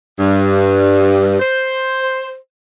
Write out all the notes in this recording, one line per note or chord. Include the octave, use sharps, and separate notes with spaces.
G2
C5